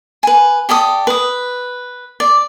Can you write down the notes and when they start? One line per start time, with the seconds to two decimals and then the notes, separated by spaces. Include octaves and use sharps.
0.23 B4 G#5
0.69 G4 A4 D5 D#6
1.07 B4 D#6
2.20 D5